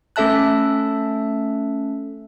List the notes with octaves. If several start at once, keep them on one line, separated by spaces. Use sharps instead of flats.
A3 C#4 A4 E5 A5 F#6